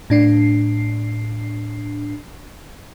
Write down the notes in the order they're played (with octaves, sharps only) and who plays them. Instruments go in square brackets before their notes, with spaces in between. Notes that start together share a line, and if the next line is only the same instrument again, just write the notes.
[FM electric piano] A2 D4 C7